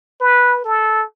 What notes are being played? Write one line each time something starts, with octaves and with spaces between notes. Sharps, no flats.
B4
A4